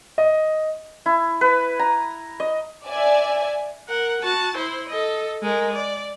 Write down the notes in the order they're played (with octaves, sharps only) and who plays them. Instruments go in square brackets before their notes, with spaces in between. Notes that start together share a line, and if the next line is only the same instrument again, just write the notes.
[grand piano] D#5
[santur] E4
B4
A#5
D#5
[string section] D5 E5 G#5
[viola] A#4 F#5
F#4 A5
E4 C5
A4 D#5
G#3 A#4
D5